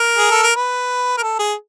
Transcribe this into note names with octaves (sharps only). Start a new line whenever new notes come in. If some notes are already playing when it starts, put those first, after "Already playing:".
Already playing: A#4
G#4
A4
A#4
B4
A#4
A4
G#4